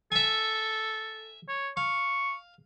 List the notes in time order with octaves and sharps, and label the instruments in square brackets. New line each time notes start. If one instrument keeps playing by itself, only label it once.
[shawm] A4 [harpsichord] E5 G#5
[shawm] C#5
[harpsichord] F5 [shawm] C#6